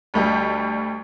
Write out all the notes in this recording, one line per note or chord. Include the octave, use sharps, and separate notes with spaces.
D2 G3 D#5